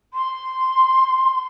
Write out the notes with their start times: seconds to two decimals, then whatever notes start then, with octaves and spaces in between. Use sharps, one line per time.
0.14 C6